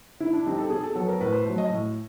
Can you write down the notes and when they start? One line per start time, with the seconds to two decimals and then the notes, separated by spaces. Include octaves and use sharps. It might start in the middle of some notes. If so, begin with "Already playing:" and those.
0.20 D3 E4
0.33 D4
0.46 G3 C4 D#4
0.58 A4
0.70 B2 G#4
0.83 A4
0.95 F#3 B3 A4
1.08 A#4
1.21 A2 B4
1.33 C5
1.45 F#3 A3
1.58 D#5
1.70 A2